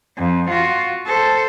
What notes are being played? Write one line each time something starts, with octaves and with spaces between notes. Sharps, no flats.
F2
F4 F#4
A4 C5